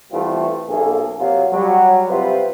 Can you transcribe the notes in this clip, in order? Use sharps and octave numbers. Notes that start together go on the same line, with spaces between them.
E3 G3 A3 B3 C4 F4
B1 C3 A#3 C#4 G#4 A4
C3 F#3 A#3 F4
F#3 G3
C3 G3 E4 F4 B4 C5